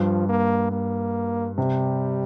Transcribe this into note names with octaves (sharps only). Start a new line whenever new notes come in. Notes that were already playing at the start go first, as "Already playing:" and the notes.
Already playing: G2 F3
A#3
A#3
C3 G3